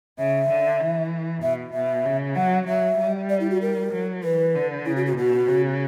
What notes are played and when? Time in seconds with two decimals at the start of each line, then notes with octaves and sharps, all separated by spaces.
0.18 C#3 E5
0.49 D3
0.80 E3
1.42 B2 E5
1.73 B2 E5
2.05 C#3
2.36 F#3 F#5
2.68 F#3 E5
2.98 G3
3.29 D5
3.40 E4
3.51 F#4
3.62 A#4
3.93 F#3
4.24 E3 B4
4.55 D3
4.85 C#3 E4
4.96 F#4
5.06 F#4
5.17 B2 F#4
5.48 C#3